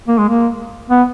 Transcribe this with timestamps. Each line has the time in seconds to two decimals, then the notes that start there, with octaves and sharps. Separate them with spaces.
0.08 A#3
0.18 G#3
0.29 A#3
0.90 B3